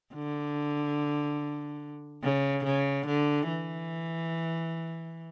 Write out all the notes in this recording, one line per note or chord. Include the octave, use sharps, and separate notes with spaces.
D3
C#3
C#3
D3
E3